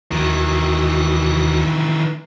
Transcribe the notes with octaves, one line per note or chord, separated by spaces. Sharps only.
D#2 D#3 E3 F#4